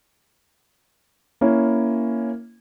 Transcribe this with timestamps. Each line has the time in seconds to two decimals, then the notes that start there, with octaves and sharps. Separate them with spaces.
1.41 A#3 C#4 E4